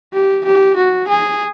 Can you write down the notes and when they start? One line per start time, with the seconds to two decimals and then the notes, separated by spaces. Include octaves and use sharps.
0.14 G4
0.45 G4
0.77 F#4
1.08 G#4